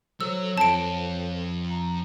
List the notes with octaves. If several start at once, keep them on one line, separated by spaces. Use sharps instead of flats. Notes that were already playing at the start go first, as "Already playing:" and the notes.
F#3 A4 C5 C#5 E6
F2 A5 D7
A#5